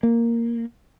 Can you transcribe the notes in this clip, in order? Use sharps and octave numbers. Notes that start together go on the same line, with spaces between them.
A#3